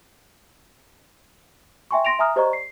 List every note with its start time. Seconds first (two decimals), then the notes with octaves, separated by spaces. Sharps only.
1.91 E5 G5 G#5 C6 C#6
2.05 C6 A#6 D7 F7
2.19 E5 G#5 A#5 D#6 F6
2.36 G4 C5 D5 D#5 A#5 C#6
2.53 C7